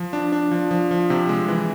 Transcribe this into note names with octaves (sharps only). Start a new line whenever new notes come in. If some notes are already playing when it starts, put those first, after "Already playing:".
Already playing: F3
D4
D4
F3
F3
F3
C3
G#3
E3